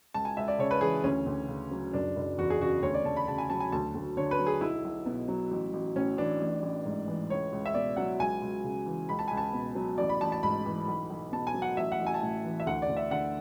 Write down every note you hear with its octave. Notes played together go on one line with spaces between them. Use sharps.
C#2 A5
G#5
C#2 E5
D5
C#3 C#5
B4
E3 G#4
D2 C#4
D2
C#3
F#3
F#1 D4
F#1
E2 F#4
G#4
C#3 F#4
D2 C#5
D5
D2 A5
B5
C#3 A5
G#5
F#3 A5
G#5
D2 A5
D2
D3 C#5
B4
F#3
G#4
B1 E4
B1
B2
F#3
A1
A1
A2 C#4
E3 D4
A1
A1
G#2
E3
C#2 C#5
C#2
E5
B2 D5
F#3 F#5
C#2 G#5
C#2
C#3
E3
C#2 B5
A5
C#2 G#5
A5
B2
F#3
A1 D5
B5
A1 A5
A5
G#2 B5
E3
B1
B1
B2 A5
G#5
F#3
F#5
A1 E5
F#5
A1
G#5
A5
A2 G#5
E3
E5
D2 F#5
D5
D2
E5
D3 F#5